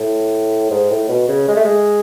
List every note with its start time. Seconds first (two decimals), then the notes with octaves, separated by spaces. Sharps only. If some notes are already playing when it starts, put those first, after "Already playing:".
Already playing: A2
0.70 G#2
0.91 A2
1.09 B2
1.28 C#3
1.48 G#3
1.56 A3
1.65 G#3